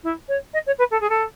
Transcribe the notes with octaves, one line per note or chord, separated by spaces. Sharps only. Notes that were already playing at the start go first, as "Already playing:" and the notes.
E4
C#5
D#5
C#5
B4
A4
G#4
A4